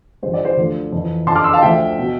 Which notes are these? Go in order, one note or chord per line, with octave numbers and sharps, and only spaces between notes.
G2 D3 F3 C5
D5
C5
D2 D3 F3
F2 E3
F2 D3 F3 A5 C6
D6 F6
C6 E6
F5 A5
D2 D3 F3 E5 G5
B2